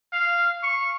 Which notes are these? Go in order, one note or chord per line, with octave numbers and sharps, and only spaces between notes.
F5
C#6